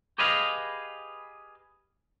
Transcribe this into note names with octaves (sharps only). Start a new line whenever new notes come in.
G4 G#4 B4 D#5 F5